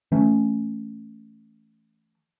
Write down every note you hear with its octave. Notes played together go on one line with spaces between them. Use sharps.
E3 A3 C#4